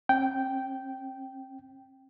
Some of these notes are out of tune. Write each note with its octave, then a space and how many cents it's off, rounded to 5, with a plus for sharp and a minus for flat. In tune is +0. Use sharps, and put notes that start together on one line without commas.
C4 +45 G5 -10